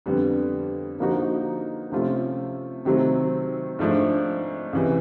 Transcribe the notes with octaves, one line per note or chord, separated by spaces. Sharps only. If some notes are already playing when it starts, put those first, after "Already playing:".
F2 D3 G3 B3
D3 F3 A#3 D#4 F#4
C3 F3 A3 C#4 F4
C3 D#3 F#3 A3 C4
G#2 F3 A3 D4
C#2 C3 E3